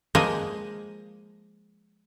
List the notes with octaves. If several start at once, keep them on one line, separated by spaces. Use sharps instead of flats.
F3 G#3 A#3 D#5 G#5